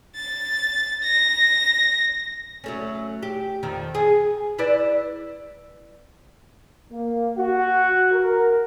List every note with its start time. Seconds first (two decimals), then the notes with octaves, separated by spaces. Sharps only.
0.16 A6
1.03 A#6
2.64 F#3 A3 C#4
3.23 G4
3.63 F2 D#3 F3
3.95 G#4
4.58 E4 B4 D5
6.90 A#3
7.37 F#4
8.12 A#4